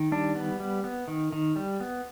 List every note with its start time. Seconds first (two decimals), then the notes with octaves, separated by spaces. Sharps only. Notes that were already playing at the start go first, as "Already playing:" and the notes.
Already playing: D#3
0.12 G3 D4
0.35 B3
0.60 G3
0.84 B3
1.08 D#3
1.32 D#3
1.56 G3
1.80 B3